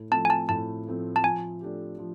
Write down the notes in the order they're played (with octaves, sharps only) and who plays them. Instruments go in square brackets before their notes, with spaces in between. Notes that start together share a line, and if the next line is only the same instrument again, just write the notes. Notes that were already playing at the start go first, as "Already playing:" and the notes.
Already playing: [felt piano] A2
[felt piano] F3 A3 C4 [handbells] A5
[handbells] G#5
A5
[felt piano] A2 [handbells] A5
[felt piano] F3 A3 C4
[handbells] A5
[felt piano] F3 [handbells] G#5
[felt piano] A3 D4 G4
F3